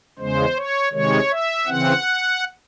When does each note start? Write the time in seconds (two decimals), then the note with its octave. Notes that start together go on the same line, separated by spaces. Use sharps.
0.19 E2 C#3 G#3 C5
0.57 C#5
0.93 C3 D#3 G#3 C#5
1.31 E5
1.67 C#3 E3 C4 F#5